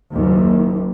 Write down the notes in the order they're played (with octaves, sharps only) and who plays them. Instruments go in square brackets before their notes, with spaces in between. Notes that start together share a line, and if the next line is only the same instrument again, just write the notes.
[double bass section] F#1 D#2